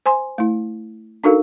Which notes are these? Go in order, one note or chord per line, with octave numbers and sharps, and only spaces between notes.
C5 G#5 C6
A3 E4
D4 D#4 F#4 A4 A#4 F5